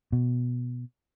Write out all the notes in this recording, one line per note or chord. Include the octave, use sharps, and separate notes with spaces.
B2